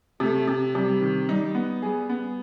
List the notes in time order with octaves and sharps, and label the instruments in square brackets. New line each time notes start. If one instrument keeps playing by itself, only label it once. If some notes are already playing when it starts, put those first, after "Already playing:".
[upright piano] C3 [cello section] A3
[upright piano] C3
[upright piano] C3 [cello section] G3
[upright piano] D#3
[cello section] G3 [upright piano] D#4
[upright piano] B3
[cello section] G3 [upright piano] G#4
[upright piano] B3